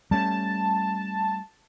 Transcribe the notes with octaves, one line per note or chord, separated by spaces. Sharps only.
G3 A3 C#4 A5